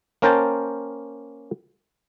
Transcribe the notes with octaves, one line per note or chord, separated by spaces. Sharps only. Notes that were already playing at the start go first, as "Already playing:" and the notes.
A#3 C#4 A#4 C5 G5 A5